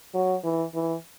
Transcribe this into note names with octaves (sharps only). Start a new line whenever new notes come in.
F#3
E3
E3